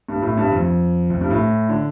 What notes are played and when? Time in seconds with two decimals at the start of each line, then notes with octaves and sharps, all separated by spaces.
0.09 G2
0.22 A2
0.37 G2
0.52 F2
1.10 F2
1.21 G2
1.30 A2
1.69 D3